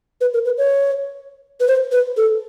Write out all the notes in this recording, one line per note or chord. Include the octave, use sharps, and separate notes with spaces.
B4
A#4
B4
C#5
B4
C5
B4
A4